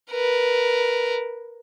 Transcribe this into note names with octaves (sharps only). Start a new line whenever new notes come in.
A#4 B4